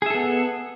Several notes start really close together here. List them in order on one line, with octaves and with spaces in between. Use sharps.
G#4 E5 A4 B3